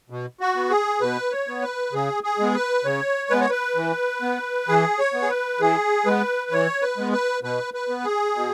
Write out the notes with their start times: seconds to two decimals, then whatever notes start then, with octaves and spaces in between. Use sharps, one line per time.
0.10 B2
0.40 F#4
0.56 B3
0.70 G#4
1.01 B2 B4
1.32 C#5
1.48 B3
1.62 B4
1.93 C#3 G#4
2.24 G#4
2.39 G#3 B3
2.55 B4
2.85 C#3 C#5
3.30 G#3 B3 B4
3.41 C#5
3.50 B4
3.76 E3
4.22 B3
4.68 E3 G#4
4.99 C#5
5.14 B3
5.22 G#4
5.29 B4
5.60 E3 G#4
6.06 G#3 B3 B4
6.51 E3 C#5
6.82 B4
6.98 G#3 B3
7.13 B4
7.43 B2 B4
7.74 B4
7.89 B3
8.04 G#4
8.36 B2